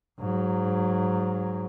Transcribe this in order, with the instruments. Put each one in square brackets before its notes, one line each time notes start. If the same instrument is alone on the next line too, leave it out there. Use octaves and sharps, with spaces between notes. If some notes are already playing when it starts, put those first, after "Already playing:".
[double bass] G#2 F#3